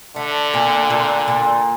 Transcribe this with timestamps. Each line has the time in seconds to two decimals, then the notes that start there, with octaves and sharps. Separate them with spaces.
0.16 D3 A3
0.54 A#2
0.90 A#2
1.28 A#2